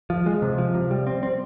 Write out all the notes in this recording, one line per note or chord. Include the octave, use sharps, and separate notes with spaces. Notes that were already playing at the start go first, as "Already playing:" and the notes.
F3
G#3
C3
F3
C3
G3
C4
C4